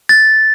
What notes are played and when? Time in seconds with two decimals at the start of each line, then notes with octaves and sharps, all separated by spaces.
0.09 A6